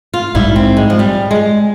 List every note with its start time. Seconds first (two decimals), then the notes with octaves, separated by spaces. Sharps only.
0.14 F4
0.35 A#1 G#2 G3 E4
0.56 C4
0.77 G#3
0.90 F3
0.99 G3
1.31 G#3